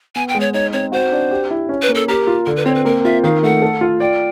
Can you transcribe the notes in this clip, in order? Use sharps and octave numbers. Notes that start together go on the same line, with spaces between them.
B3 G#5
G5
G#3
C#5
D#4 C#5
C4 C#5
F#4 C5
D4
G4
E4
C#4
B4
A#3
A4
G4 A#4
F4
D3 A#4
B4
C4 C#5
B4
A#3 A#4
F4 E5
D#3 F5
A3 F#5
A4
F4
D5 G5